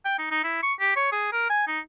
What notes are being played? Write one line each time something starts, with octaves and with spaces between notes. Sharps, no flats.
G5
D#4
D#4
E4
C#6
G4
C#5
G#4
A#4
G#5
D#4